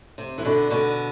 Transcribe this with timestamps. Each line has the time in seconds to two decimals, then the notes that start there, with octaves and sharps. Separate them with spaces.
0.18 C3
0.38 E3
0.45 B2 D3
0.70 B2 D3